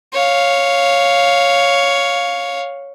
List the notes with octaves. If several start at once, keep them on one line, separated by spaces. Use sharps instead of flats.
C#5 F5